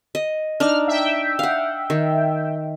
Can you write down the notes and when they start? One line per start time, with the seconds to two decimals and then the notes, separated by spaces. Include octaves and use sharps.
0.15 D#5
0.60 D4 D#4 D5 F6
0.88 E5 G5
1.39 F5 F#5
1.90 D#3